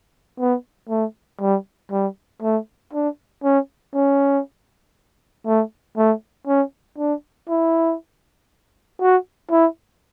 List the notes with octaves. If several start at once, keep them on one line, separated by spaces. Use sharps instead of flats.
B3
A3
G3
G3
A3
D4
C#4
C#4
A3
A3
C#4
D4
E4
F#4
E4